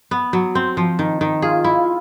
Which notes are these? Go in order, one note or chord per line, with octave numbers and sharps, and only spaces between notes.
B3
F#3
C4
F3
D#3
D#3
F4 G#4
E4